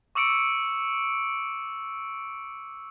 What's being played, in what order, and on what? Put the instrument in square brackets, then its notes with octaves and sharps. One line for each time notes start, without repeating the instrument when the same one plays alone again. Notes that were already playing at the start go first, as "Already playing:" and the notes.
[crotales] C#6 D6 E6 C#7 D7